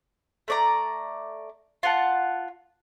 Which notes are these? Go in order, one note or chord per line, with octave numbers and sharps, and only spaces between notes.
A3 D5 A#5
F4 F#5 A5